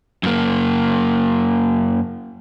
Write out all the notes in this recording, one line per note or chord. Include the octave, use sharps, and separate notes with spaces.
F#2 A#3